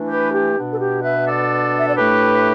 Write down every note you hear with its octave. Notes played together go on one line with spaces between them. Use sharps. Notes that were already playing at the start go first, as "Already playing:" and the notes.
Already playing: E3 A3 D4
G4 B4
G4
B2 B3 D4
A4
G4
B4 E5
A4 D5
E5
D5
A2 A3 D4 G4 B4